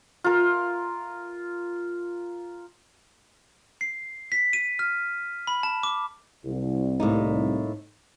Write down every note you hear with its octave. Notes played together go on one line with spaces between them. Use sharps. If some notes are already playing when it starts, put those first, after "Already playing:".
F4 A#4
C7
B6
D#7
F6
B5
A5
D6
C2
A2 A#3 D#4